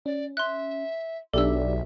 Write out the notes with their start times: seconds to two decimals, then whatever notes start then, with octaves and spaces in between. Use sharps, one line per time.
0.06 C#4 D5
0.37 E5 C6 F#6
1.34 B1 D4 G4 A4 D5 E5 E6